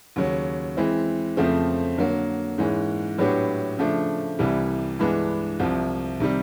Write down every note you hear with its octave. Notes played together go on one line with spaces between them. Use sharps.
D#2 C#3 F#3
E3 G#3 C4 E4
F2 C#3 F3 A3 C4
D3 F#3 A#3
G#2 E3 G#3 C#4
A2 F#3 B3 D4 G4
C#3 F3 A3 D4
C2 C3 E3 G3
G2 E3 G#3 B3 D4
C2 C3 F3
C3 D#3 G3